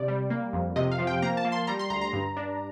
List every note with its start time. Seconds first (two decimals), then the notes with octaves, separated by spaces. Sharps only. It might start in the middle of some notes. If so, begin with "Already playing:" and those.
Already playing: C3 D5
0.08 G3
0.30 A#3
0.53 F2
0.76 C3 D#5
0.91 F5
0.99 F3
1.07 G5
1.22 A#3 A#5
1.37 A5
1.45 A#3
1.52 C6
1.67 G3 A#5
1.79 C6
1.90 D2 A#5
2.01 A#5
2.13 G2
2.37 D4